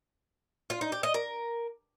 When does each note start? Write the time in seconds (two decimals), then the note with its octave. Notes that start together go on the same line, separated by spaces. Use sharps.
0.70 F4
0.81 D#4
0.92 G4
1.03 D#5
1.14 A#4